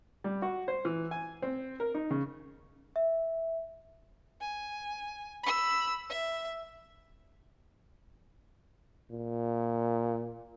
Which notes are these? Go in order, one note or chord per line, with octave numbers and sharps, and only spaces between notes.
G3
F#4
C5
E3
G#5
C4
A#4
D#4
C#3
E5
G#5
B5 E6
E5
A#2